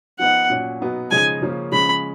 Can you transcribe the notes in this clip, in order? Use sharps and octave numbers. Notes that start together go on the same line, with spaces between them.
F3 B3 D#4 F#5
A#2 F#3 C#4
B2 F#3 B3 D#4
C#3 F3 G#3 D#4 G#5
C#3 F3 A#3 C#4
C#3 F3 G#3 C#4 B5